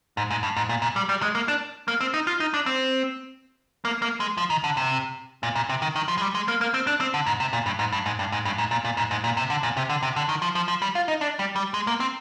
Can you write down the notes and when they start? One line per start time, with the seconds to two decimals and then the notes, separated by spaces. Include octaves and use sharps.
0.17 G#2
0.31 G#2
0.43 G2
0.57 G#2
0.69 A#2
0.82 A#2
0.96 G3
1.09 G3
1.22 G#3
1.35 A#3
1.48 D4
1.88 A#3
2.01 C4
2.14 D#4
2.27 F4
2.40 D#4
2.54 D4
2.66 C4
3.85 A#3
4.02 A#3
4.20 G#3
4.38 F3
4.50 D#3
4.64 D3
4.77 C3
5.43 A#2
5.55 A#2
5.69 C3
5.82 D#3
5.96 D#3
6.08 F3
6.18 G#3
6.21 G3
6.35 G#3
6.48 A#3
6.61 A#3
6.74 C4
6.87 D4
7.00 C4
7.14 D3
7.27 G#2
7.40 C3
7.53 A#2
7.66 G2
7.79 G#2
7.92 G2
8.06 G#2
8.19 G2
8.32 G#2
8.45 G2
8.58 G#2
8.71 A#2
8.85 A#2
8.97 G#2
9.11 G#2
9.24 A#2
9.37 C3
9.50 D3
9.63 A#2
9.77 C3
9.89 D3
10.02 C3
10.16 D3
10.29 D#3
10.42 F3
10.55 F3
10.68 F3
10.82 G3
10.95 F4
11.08 D#4
11.21 D4
11.39 G3
11.56 G3
11.74 G#3
11.87 A#3
12.00 C4